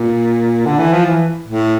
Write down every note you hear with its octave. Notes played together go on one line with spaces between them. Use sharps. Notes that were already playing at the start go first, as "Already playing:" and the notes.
Already playing: A#2
D3
E3
F3
E3
A2